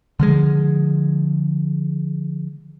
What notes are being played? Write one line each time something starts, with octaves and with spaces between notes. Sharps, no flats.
D3 F3 G#3